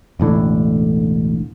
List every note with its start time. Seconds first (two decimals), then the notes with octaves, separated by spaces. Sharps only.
0.20 E1 A1 A2 D3